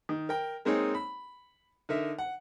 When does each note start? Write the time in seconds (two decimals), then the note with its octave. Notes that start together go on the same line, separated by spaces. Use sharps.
0.09 D#3
0.29 A#4 G5
0.65 G#3 A#3 C4 D#4 G#4 C#5
0.95 B5
1.89 D3 D#4 A#4 E5
2.19 F#5